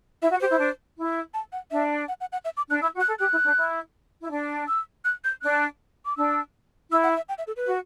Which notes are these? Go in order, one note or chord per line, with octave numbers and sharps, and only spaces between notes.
E4 E5
F#4
G4 C5
E4
D4
E4
A5
F#5
D4 E5
F#5
F#5
F#5
E5
D6
D4 F#6
E4 E6
F#4
F#6
A4
G4 F#6
E4
D4
E4
E4
D4
E6
F#6
G6
D4 F#6
D6
D4 E6
E4 E6
F#5
E5
G5
E5
A4
B4
F#4